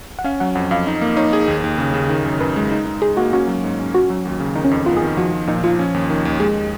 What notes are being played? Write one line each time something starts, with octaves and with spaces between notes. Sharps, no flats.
F#5
C#4 F5
F#3 F#5
F2 F#5
F2 F5
D#4
A#3 D#5
D#4 C#5
G#4
D#2
D#2
C#3
C#3
D#3
F#2
F#2 B4
G#3
D#4
D#4
D#4 G#4
A#3 F#4
C#4 F#4
F#3
G#2
C#4
C#4 F#4
F#3
D#2
C#3
D#3 D#4
C#4
F2 D#4
B3 F4
A#4
G#4
D#3
F3 F#4
F3
A#2 D#4
F3 F4
C#4
D#2
D#3
D#2
G#3 G#4